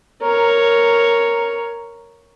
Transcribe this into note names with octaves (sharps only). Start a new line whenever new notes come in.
A#4 C#5